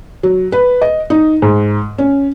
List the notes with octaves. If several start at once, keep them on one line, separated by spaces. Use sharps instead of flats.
F#3
B4
D#5
D#4
G#2
C#4